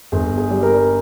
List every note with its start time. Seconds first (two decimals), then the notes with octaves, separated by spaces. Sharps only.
0.12 G1 G#4
0.38 G#4
0.50 G3
0.63 A#4